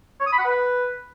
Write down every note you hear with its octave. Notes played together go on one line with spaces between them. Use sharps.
C#5
D#6
B5
F#5
B4